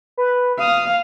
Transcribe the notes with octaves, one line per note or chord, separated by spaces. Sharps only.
B4
F5 D#6